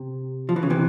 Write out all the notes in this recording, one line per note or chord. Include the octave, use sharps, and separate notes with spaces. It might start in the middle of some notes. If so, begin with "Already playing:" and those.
Already playing: C3
F3
E3
C#3
C3 E3